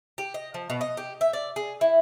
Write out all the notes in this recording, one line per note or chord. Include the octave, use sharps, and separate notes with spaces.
G4
D#5
F3
B2
D#5
G4
E5
D5
G#4
E4